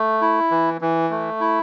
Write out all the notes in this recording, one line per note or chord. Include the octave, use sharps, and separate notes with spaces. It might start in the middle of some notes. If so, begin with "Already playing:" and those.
Already playing: A3
E4
E3
E3
A3
E4